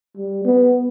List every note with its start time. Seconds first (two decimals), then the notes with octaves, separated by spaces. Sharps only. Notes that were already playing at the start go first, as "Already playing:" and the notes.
0.17 G3
0.45 B3